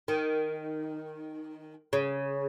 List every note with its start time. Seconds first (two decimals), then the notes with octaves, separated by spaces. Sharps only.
0.08 D#3
1.93 C#3